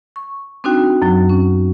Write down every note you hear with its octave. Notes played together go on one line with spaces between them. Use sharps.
C#6
C4 D4 D#4 F#4 G5
F#2 F#3 F#4
C#4